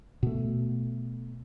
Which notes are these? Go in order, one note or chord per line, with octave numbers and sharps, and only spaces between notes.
B2 A3